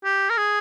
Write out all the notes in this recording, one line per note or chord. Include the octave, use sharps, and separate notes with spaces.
G4
A#4
G#4